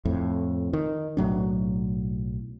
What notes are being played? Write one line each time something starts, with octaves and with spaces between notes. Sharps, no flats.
F2 A2
D#3
B1 A2 F#3 D4